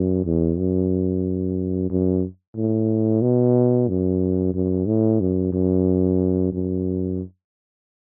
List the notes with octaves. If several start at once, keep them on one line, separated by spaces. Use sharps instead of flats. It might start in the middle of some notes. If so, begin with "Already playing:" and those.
Already playing: F#2
E2
F#2
F#2
A2
B2
F#2
F#2
A2
F#2
F#2
F#2